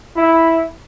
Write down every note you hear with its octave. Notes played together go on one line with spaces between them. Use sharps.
E4